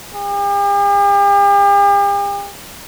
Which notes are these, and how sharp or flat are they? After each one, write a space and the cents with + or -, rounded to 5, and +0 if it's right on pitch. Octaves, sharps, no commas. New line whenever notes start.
G4 +45